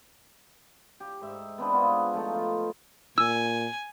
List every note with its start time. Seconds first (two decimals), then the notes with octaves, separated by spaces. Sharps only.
1.00 G4
1.21 G#2 E5
1.58 B3 C4 D4 B4
1.72 B3 F4 G#4
2.13 F3 A3 D#4
2.33 F3 F4
3.18 A#2 G#5 E6